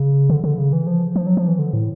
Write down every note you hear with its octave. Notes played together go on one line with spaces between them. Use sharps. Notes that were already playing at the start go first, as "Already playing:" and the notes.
Already playing: C#3
D3
D3
C#3
E3
F3
F3
F#3
F3
E3
D3
A2